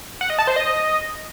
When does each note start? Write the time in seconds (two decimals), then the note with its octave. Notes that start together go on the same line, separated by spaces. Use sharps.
0.21 F#5
0.30 D#5
0.39 A5
0.47 C5
0.56 D#5